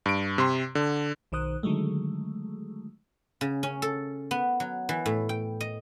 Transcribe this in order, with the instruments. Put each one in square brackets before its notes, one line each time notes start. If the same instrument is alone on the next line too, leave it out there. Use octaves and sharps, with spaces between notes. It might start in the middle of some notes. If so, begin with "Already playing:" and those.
[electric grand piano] G2 D7
C3 C6
D3
[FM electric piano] B1 D#3 C5 D#6 F#6
D3 D#3 F#3 G#3 A3
[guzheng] C#3
C#4
A4
B3
F#3
E3
A2
G5
D#5